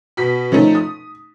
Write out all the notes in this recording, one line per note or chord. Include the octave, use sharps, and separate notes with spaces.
B2 B6
F3 A3 C#4 D#4
D#6